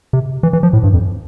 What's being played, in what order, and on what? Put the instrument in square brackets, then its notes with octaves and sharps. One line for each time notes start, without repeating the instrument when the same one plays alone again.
[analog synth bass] C3
E3
E3
F3
A2
G2
F2